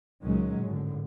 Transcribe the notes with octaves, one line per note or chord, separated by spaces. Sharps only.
C#2 A#2 D#3 F#3 G#3 C#4
G#1 A2 D3